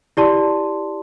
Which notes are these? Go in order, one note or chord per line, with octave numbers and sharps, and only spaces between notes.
E4 G4 D5 A5 C6